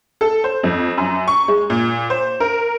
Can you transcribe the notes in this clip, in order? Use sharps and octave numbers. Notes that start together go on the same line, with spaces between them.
A4
C5
F2
F#2
C#6
G#3
A#2
C5
A#4